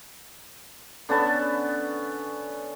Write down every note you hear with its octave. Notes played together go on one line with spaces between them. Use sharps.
D3 B3 C#4 A5